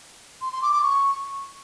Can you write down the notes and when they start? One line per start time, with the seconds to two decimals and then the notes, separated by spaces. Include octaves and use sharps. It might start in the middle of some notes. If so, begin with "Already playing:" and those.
0.41 C6
0.52 C6
0.62 D6
0.72 D6
0.82 C#6